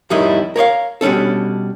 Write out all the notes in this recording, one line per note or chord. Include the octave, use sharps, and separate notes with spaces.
F2 A2 D#3 G3 D#4 E4
A#4 C#5 D5 F5
B2 G3 C#4 D4 A4